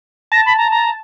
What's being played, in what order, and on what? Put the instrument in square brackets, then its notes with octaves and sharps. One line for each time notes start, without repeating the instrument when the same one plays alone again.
[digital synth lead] A5 [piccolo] A#6
[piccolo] B5
A#5
A#5